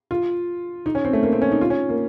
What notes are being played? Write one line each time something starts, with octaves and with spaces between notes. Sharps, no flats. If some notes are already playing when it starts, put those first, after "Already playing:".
F4
D#4
C#4
C4
A3
A#3
C4
C#4
D#4
F4
C#4
A#3